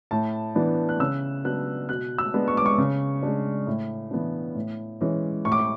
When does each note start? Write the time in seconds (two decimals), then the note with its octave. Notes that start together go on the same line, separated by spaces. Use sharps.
0.11 A2 A5
0.55 E3 B3 D4
0.89 F#6
1.00 C#3 E6
1.44 F#3 B3 D4 F#6
1.88 B2 F#6
2.18 E6
2.34 G#3 B3 D4
2.48 C#6
2.57 D6
2.66 C#6
2.78 C#3
3.23 G#3 D4
3.67 A2
4.11 E3 B3 D4
4.55 A2
5.01 E3 G#3 C#4
5.45 A2 C#6
5.52 D6
5.59 C#6